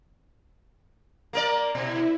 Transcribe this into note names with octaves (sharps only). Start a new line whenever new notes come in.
A#3 A#4 D5
B2 E4